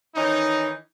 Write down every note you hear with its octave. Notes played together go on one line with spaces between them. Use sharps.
D#3 E3 C#4 D#4